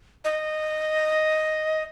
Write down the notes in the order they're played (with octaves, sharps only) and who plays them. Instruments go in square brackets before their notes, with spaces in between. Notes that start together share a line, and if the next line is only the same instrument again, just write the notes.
[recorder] D#5